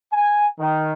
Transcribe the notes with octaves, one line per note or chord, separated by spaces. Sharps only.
G#5
D#3